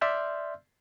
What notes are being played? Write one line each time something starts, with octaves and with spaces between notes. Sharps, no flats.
D5 E5 C6 E6 F6 G6